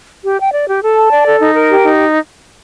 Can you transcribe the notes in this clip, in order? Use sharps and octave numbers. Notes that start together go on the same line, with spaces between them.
G4
G5
D5
G4
A4
A5
D5
A4
D#4
A#4
G4
D#4